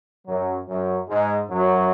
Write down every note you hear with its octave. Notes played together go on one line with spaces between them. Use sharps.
F#2 F#3
F#2 F#3
G#2 G#3
F#2 F#3